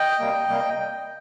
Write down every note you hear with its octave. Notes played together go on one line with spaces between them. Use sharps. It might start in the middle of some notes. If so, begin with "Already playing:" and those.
Already playing: D#5 G5
C3 G3 A#3
C3 G3 A#3